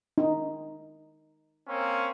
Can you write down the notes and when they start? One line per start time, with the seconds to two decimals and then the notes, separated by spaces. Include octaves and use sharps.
0.18 D#4
1.67 A#3 C4 C#4